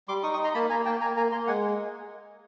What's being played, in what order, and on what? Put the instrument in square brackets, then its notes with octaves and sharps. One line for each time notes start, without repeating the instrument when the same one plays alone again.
[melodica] G3 C6 D6
D#4 C#6 D#6
C#6 D#6
D#4
A#5 C6
A#3 A5 B5
A#3 G#5 A#5
A#3 G5 A5
A#3 G#5 A#5
A#3 G#5 A#5
A#3 A#5 C6
G#3 F#5 G#5